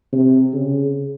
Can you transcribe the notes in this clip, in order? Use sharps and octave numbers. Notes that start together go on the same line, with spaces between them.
C3
C#3